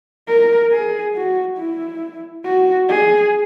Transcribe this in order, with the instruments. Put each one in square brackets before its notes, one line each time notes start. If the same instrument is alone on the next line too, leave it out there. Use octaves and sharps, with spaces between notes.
[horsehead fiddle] A#4
G#4
F#4
E4
F#4
G#4